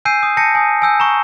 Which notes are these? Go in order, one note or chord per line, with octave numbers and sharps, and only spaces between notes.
G#5 E6 G6 C7 D#7
D#6
A5 G6 A#6 C#7
G#5 D#6
G#5 E6 G6
A#5 C#6